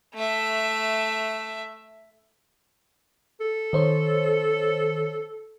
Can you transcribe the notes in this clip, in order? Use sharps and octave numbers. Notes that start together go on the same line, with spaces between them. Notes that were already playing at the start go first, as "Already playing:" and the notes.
A3 E5
A4
D#3 C5 C#5